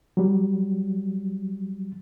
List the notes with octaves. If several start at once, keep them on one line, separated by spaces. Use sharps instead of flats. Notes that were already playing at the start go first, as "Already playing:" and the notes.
F#3 G3